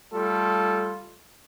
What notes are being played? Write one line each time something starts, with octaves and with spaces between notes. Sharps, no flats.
G3 A3 F4 A4